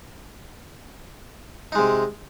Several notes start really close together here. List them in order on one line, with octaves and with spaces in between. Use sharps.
D#4 G#3 C3